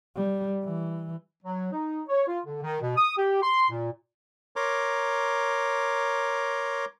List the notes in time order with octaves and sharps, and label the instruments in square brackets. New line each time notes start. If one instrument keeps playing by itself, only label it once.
[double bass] G3
E3
[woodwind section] F#3
D#4
C#5
F4
D3
D#3
B2
D#6
G4
C6
A#2
[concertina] A#4 C#5 A#5 C6 D6